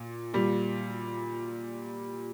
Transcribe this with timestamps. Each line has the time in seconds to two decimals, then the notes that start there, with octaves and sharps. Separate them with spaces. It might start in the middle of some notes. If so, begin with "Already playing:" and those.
Already playing: A#2
0.34 A#2 G3